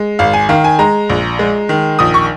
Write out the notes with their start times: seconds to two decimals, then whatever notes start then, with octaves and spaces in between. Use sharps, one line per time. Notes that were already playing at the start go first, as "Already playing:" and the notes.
Already playing: G#3
0.19 G#1 F5
0.33 G#5
0.49 D#3 F5
0.64 G#5
0.79 G#3 A#5
1.10 A#1
1.39 G#3
1.69 D#3
1.99 A#1 D#6
2.14 C#6